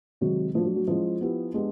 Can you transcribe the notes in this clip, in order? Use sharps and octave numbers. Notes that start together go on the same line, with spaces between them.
C3 D#3 F#3 G#3
F3 A3 D4 F#4
F#3
F#3
F3 G#3 C#4 E4
B3 E4 G4
G#3 B3 D4 G4